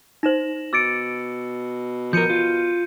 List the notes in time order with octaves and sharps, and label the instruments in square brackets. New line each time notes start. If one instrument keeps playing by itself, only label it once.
[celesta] D#4 C5 [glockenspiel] A#6 E7 F#7
[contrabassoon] B2 [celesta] D6 A6 D7 [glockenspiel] E6 C#7
[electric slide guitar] F3 A#4 [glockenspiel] G6 C#7 D#7
[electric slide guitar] F4